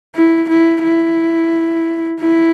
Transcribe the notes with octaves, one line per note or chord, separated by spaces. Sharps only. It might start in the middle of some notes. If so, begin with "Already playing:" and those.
E4
E4
E4
E4